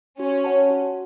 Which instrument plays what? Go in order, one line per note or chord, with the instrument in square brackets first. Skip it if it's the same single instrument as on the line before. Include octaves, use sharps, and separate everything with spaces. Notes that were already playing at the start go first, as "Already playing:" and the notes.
[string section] C#4 [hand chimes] F#4
[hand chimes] C#5 F#5 A5
F#4